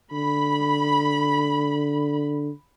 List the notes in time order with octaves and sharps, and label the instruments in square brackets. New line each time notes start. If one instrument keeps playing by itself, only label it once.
[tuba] D3 [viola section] B5